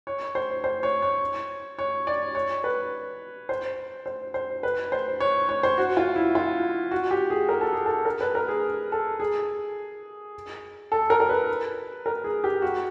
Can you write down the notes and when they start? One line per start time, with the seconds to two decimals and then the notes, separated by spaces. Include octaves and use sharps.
0.07 C#5
0.35 C5
0.64 C5
0.83 C#5
1.02 C#5
1.79 C#5
2.07 D5
2.35 C#5
2.64 B4
3.49 C5
4.06 C5
4.34 C5
4.63 B4
4.92 C5
5.20 C#5
5.49 C#5
5.63 C5
5.78 F#4
5.97 F4
6.16 E4
6.35 F4
6.91 F#4
7.11 G4
7.30 G#4
7.49 A#4
7.61 A4
7.73 G#4
7.86 A4
8.05 A#4
8.21 B4
8.35 A#4
8.49 G#4
8.92 A4
9.20 G#4
10.92 A4
11.10 A#4
11.20 A#4
11.29 B4
12.06 A#4
12.24 G#4
12.44 G4
12.62 F#4